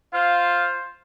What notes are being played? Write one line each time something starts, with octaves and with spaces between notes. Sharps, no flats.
F4 C5 F5